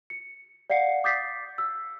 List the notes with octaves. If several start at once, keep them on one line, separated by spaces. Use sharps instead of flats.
C#7
D5 F5 F#5 C7 C#7
D6 D#6 G6 A6 B6 C7
E6